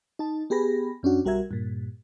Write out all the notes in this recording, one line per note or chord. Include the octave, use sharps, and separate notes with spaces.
D#4 A5
B3 G4 G#4 B5 A#6
F#2 C#4 D4 F#4
B1 G3 F#4 A#4 E5 G#6
G2 A#2